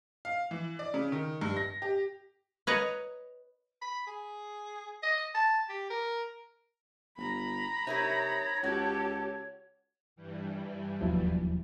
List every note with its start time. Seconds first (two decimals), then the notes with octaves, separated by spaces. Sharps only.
0.25 F5
0.51 E3
0.79 D5
0.94 C#3
1.12 D#3
1.41 G2
1.57 A#6
1.82 G4
2.67 B4 C#5 D#5 A#5
3.82 B5
4.07 G#4
5.03 D#5
5.34 A5
5.69 G4
5.90 A#4
7.17 G1 A#5 B5
7.87 C3 D#4 E4 A#4 C#5
8.63 C#2 F#4 G4 A4
10.16 G2 E3 G3
11.01 E1 D#2 F3 F#3 E4